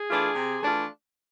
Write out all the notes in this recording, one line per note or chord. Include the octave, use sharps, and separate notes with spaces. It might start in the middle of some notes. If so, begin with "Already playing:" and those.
Already playing: G#4
E3 A3 D4 F4
C3
E3 A3 D4 F4